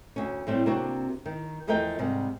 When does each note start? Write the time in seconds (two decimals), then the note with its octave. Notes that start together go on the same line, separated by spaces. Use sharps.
0.16 D2 C#4
0.47 A2 G3 A3 C4
0.66 C3 A#3 C4 D4 F#4
1.26 D#3
1.67 E2 F3 A3 A#4 D#5 G5
1.99 G#2 C3 G3